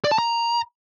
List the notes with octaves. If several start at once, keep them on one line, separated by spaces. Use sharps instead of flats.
D5
A5
A#5